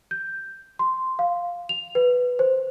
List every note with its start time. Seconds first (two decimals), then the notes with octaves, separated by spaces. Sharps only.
0.11 G6
0.79 C6
1.19 F5
1.69 F7
1.95 B4
2.39 C5